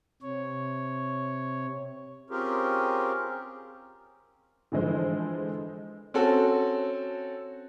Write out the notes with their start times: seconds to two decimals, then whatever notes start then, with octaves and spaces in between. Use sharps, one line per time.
0.22 C3 C#5
2.30 C4 C#4 F4 G4 G#4 A#4
4.72 D3 E3 F3 G#3 C5
6.14 C4 C#4 F#4 A4